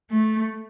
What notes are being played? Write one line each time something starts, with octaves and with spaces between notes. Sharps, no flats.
A3